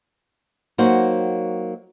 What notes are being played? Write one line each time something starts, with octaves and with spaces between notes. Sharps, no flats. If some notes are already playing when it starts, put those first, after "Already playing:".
F#3 A#3 D#4 F#4 C5